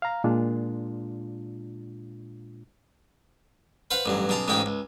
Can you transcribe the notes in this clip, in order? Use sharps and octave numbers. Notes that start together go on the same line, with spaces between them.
F5 A#5
A#2 G#3 D4 F4
B4 C5 F5 F#5
A1 G2 F#3
B1 C#3 A5 A#5 C6
A1 G#2 C#3 G#3 D#4 G5
C#2